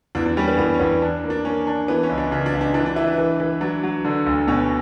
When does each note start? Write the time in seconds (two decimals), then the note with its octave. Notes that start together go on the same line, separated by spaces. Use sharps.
0.15 E2 D4
0.26 D4
0.37 G3 C#4
0.48 B3
0.58 E2 B3
0.74 C#4
0.80 E2 B3
1.02 D4
1.24 A#3
1.30 D4
1.45 A#3 C#4
1.67 D4
1.88 E3 B3
2.03 C#4
2.09 C#2
2.18 D4
2.31 C#3 D4
2.46 D4
2.53 C#2
2.61 D4
2.74 E3 D4
2.86 D4
2.96 E3 E4
3.07 D4
3.18 E3
3.40 E3
3.61 F#3 D4
3.83 F#3
4.05 D3
4.26 D2
4.48 B2 C#4